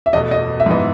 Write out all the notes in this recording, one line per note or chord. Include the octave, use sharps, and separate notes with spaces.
E5
E2 B2 A3 D#5
D#5
E5
G#2 E3 B3 D#5